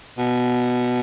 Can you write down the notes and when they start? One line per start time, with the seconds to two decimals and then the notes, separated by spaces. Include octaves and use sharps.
0.18 B2